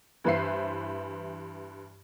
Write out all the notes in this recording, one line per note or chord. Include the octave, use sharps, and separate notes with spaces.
G2 E3 B4 C5 E5 C7